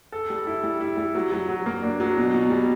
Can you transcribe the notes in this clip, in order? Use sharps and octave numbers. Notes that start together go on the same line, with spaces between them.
A4
G3
E4
G3
E4
G3
F#3
F#3
F#3
A#3
D4
F#3
B2
B2
G3